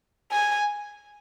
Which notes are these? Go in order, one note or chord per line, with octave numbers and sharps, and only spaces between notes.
G#5